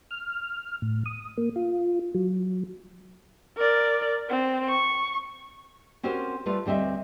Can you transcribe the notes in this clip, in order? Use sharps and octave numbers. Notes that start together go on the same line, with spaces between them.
F6
A2
D#6
A#3
F4
F#3
A#4 D5
C4
C#6
C4 C#4 F#4 G4 A#4 C5
G3 A3 F4 B4
D2 G3 C4 D#5 E5